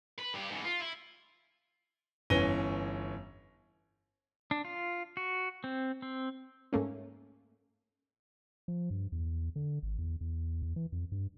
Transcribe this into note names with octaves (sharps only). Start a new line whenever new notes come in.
B4
G2 G4
G#2 E3
F4
E4
G1 E3 C#4 A#6 D#7 G7
D4
F4
F#4
C4
C4
G#2 A3 A#3 C#4
F3
G2
E2
D3
G#1
E2
E2
E2
E3
F2
G2